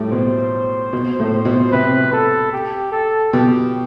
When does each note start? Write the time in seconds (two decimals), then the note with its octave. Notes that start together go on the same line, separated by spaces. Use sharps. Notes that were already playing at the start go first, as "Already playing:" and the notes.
Already playing: A2 G3
0.12 B2 C5
0.93 B2
1.20 A2
1.45 B2
1.72 C3 B4
2.13 A4
2.53 G4
2.92 A4
3.33 B2 G4